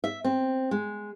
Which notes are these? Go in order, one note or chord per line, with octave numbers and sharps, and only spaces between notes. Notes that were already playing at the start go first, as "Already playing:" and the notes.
E5
C4
G#3